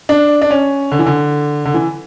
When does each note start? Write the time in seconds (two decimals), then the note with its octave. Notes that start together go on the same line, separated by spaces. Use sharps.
0.09 D4
0.42 D4
0.51 C#4
0.92 D3
0.99 E3
1.06 D3
1.65 D3
1.74 E3